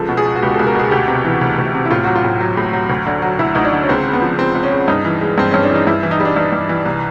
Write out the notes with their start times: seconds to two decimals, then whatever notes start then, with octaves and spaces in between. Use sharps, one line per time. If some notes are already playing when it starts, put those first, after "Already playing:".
Already playing: C#2 F3 A4
0.09 B2
0.17 G#4
0.25 G#3
0.36 F#4
0.42 C#2 G4
0.54 A4
0.59 C#2
0.67 A#4
0.75 B2 G#4
0.91 D2 G4
1.08 C3
1.25 E3
1.41 D2
1.58 D2
1.74 C3
1.85 E4
1.91 A2 F4
2.04 F#3 F#4
2.16 F4
2.24 A2
2.41 F#3
2.57 A2
2.73 F#3
2.89 D2
3.06 D3
3.22 F#3
3.39 D2 E4
3.54 D2 D#4
3.65 D4
3.73 D3
3.82 C#4
3.89 C#2 C4
4.05 C#3
4.13 B3
4.22 F3
4.38 C#2 C4
4.55 C#2
4.63 C#4
4.71 C#3
4.88 G2 D#4
5.05 E3
5.21 G#3
5.38 G2 C4
5.51 G2 C#4
5.63 D4
5.70 E3 D#4
5.87 G2 E4
6.03 E3
6.11 D#4
6.20 G3
6.25 D4
6.36 G2 D#4
6.52 G2
6.69 E3
6.86 C2